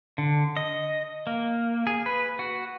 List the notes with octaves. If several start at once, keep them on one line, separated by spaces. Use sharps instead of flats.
D3
D#5
A#3
G#4
B4
F#4